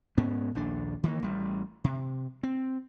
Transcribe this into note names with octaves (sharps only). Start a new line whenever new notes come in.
G#2 B3 C#4
A#1 D#2 D4
D#3 E3 G#3 A#3
A1 G3
C3
C4